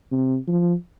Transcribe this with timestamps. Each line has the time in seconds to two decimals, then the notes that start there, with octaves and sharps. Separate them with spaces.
0.12 C3
0.48 F3